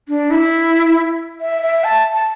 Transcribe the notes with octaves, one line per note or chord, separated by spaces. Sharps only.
D4
E4
E5
E5
A5
A5